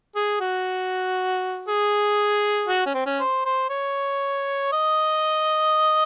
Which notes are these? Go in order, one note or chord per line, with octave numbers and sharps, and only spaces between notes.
G#4
F#4
G#4
F#4
C#4
C4
C#4
C5
C5
C#5
D#5